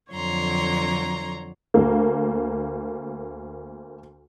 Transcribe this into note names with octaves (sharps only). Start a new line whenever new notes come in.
F2 D3 F#3 C#5 A#5 C6
D2 A#3